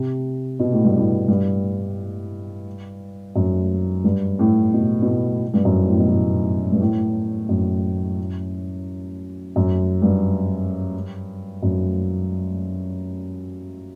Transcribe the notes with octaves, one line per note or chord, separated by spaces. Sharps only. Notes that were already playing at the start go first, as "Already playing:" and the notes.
Already playing: C3
B2
A2
G2
A2
G2
F#2
G2
A2
B2
B2
A2
G2
F#2
A2
B2
A2
G2
A2
F#2
F#2
G2
F#2